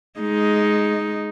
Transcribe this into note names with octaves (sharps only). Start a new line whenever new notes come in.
G#3 D#4